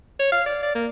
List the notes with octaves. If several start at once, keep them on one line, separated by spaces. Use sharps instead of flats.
C#5
F5
D5
D5
A#3